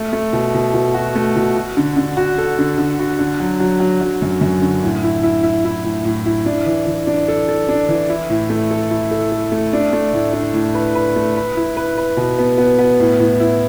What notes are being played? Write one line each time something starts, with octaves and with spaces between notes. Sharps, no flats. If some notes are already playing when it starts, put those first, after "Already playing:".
Already playing: A3
A3
B2
B2
B2
F#4
A3
B2
F#4
D3
D3
F#4
A4
D3
D3
F#4
D3
F#3
F#3
F#3
F#3
F#2
F#2
D3
A2
E4
E4
E4
E4
A2
A2
E4
D4
E3
E3
D4
A4
A4
D4
E3
E4
A2
A3
A4
E4
A4
A4
A3
D4
A3
A2
D4
A2
B4
B4
A3
B4
E4
B4
B4
B2
B3
B3
B3
A2
A2
E4